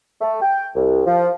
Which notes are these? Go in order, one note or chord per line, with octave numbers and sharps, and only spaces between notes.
A3
G5
C2
F3